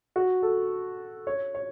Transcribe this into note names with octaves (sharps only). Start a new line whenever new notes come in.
F#4
A4
C#5
C#5